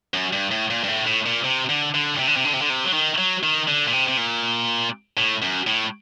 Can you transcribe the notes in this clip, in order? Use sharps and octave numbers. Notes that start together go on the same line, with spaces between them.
F#2
G2
A2
A#2
G2
A2
A2
A#2
C3
D3
D3
C3
D3
C3
D3
C3
D3
C3
F#3
D#3
F#3
D#3
D3
A#2
C3
C3
A#2
A2
F#2
A2